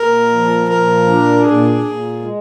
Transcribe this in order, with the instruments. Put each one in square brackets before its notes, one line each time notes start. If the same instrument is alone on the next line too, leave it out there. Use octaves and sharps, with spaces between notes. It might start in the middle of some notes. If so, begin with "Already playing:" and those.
Already playing: [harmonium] A#2 [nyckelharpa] A#4
[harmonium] F3
[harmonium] A#2 [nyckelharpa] A#4
[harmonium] D4
[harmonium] A#2 [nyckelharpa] G#4
[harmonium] A#2
G#3